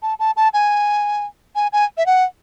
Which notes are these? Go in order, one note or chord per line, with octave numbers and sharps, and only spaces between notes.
A5
A5
A5
G#5
G#5
G#5
E5
F#5